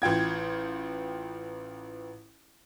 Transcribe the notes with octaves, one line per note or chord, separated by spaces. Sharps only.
A1 F4 G5 G#6